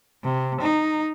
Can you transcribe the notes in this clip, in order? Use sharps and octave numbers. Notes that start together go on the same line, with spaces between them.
C3
D#4